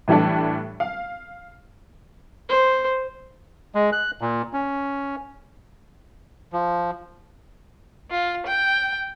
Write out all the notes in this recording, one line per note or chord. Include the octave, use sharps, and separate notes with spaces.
A2 E3 G3 A3 D4
F5
C5
G#3
F#6
A#2
C#4
F3
F4
G5